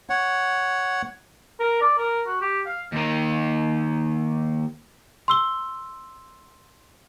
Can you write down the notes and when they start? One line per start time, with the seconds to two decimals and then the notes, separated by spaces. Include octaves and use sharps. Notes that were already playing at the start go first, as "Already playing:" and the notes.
0.10 C#5 F#5
1.60 A#4
1.81 D5
1.98 A#4
2.27 F#4
2.41 G4
2.66 F5
2.92 D#2 D#3
5.28 C6 E6 G7